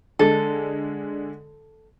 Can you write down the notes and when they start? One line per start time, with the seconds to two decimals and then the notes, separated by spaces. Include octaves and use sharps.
0.19 D3 G#3 A4